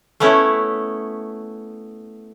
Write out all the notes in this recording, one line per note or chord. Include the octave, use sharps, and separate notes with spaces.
A3 B3 C#4 E4